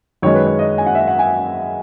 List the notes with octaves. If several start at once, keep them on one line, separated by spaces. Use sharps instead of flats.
F#2 D#3 G#3 C#5
B4
C#5
D#5
G#5
F#5
E5
F#5
G#5